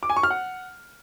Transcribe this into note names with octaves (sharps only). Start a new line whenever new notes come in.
D6
G#5
C#6
F6
F#5